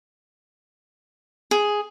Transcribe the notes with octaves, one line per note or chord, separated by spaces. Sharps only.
G#4